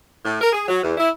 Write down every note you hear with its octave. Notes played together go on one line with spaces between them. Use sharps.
A2
A#4
G#4
F#3
E2
E4